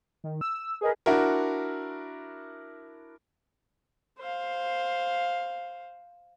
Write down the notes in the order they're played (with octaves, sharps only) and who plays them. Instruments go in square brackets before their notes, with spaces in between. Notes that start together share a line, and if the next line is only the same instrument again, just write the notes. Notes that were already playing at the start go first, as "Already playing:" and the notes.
[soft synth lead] D#3
E6
[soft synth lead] G#4 [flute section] A#4 B4 D#5
[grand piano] D4 E4 F#4 A#4
[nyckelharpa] C5 F5